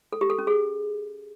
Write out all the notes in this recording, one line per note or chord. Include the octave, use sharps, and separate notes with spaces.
A4
G4
A4
C#4
G#4